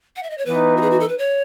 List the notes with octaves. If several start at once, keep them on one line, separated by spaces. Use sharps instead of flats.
F#5
E5
D#5
C#5
E3 B3 D#4 B4
F#4
G#4
F#4
A4
B4
C#5